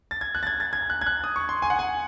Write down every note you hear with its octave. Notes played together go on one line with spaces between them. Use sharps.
A6
G#6
F#6
A6
G#6
A6
G#6
F#6
G#6
F#6
D#6
C#6
C6
G#5
F#5
G#5